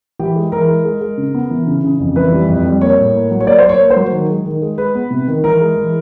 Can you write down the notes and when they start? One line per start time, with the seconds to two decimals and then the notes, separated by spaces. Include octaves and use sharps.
0.19 E3 G4
0.36 G#3
0.52 E3 A#4
0.68 G#3
0.85 G#3
1.01 G#3
1.18 C#3
1.34 B3
1.50 E3
1.67 C#3
1.84 C#3
2.00 F2
2.16 E3 B4
2.32 G3
2.49 F2
2.66 G3
2.81 A#3 C#5
2.98 A2
3.15 A#3
3.31 F#3
3.40 C#5
3.47 A#3 D5
3.59 A#3 C5
3.69 C#5
3.80 A#3
3.90 C5
3.96 F#3
4.12 D#3
4.29 G#3
4.45 D#3
4.62 G#3
4.78 G#3 B4
4.95 B3
5.10 C3
5.28 D#3
5.43 E3 A#4
5.61 G#3
5.76 E3